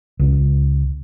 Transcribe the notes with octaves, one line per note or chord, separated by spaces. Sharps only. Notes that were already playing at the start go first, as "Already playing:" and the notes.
C#2